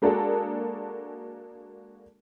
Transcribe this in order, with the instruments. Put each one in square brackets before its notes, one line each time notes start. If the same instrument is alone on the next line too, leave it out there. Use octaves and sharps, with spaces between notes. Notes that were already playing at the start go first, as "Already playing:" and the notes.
[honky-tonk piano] G#3 A#3 D4 F#4 G#4 A4